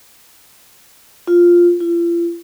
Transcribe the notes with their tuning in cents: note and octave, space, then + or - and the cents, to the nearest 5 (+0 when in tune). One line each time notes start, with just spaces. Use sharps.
F4 +0
F4 -40